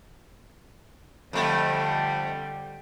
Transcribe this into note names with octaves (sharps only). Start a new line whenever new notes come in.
F2 D3 G3 A3